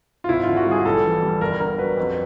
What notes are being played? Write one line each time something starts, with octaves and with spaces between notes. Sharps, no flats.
F4
G#1 E4
D3 F4
F#4
G3 G#4
A#1 A4
E3
G3
G1 A#4
D3 A#4
F#3 B4
F2